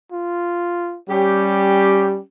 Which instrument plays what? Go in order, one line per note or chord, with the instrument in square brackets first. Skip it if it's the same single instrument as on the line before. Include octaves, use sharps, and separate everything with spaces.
[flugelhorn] F4
[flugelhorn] G3 [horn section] C#4 G4